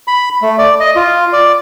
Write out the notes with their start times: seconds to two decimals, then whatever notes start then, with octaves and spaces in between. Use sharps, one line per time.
0.08 B5
0.42 A3
0.58 D5
0.80 D#5
0.96 F4
1.33 D5